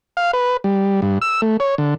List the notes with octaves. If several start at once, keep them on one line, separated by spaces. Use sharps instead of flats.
F5
B4
G3
G2
E6
A3
C#5
D3